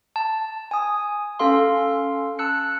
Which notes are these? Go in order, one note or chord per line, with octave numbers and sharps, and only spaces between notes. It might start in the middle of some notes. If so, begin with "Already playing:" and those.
A5
G#5 D#6
C#4 A4 F5 C6
A5 E6 F#6 C#7